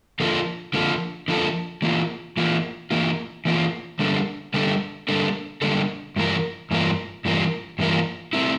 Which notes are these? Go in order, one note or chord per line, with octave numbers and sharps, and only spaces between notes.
D3 F3 A#3 F4 A4
D3 F3 A#3 F4 A4
D3 F3 A#3 F4 A4
E3 A#3 F4
E3 A#3 F4
E3 A#3 F4
E3 A#3 F4
D3 G3 A#3 D4 A4
D3 G3 A#3 D4 A4
D3 G3 A#3 D4 A4
D3 G3 A#3 D4 A4
G2 E3 A#3 F4 A#4
G2 E3 A#3 F4 A#4
G2 E3 A#3 F4 A#4
G2 E3 A#3 F4 A#4
A3 C4 E4 A#4